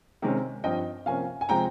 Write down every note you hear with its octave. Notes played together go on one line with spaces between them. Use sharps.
C3 D#3 G#3 C#4
G2 F3 C4 D#5 G5
C3 F3 A#3 C#4 F5 G#5
G#5
C3 F3 G#3 G5 A#5